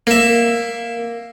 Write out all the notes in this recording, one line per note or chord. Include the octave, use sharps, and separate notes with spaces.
A#3 E5